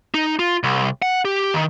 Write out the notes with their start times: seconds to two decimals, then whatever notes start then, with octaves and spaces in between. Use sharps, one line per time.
0.14 D#4
0.39 F4
0.63 C2
1.02 F#5
1.25 G4
1.54 D#3